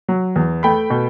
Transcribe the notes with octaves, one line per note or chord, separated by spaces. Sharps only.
F#3
E2
A3 G5 B5
B2